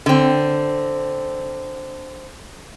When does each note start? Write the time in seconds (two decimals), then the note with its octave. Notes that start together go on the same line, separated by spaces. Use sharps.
0.06 D3 C4